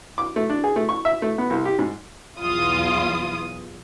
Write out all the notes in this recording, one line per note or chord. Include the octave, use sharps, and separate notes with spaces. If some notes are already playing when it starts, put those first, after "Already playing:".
D6
A3
D4
G#4
A3
C#6
E5
A3
B3
C2
G4
G#2
B1 E2 F4 D#6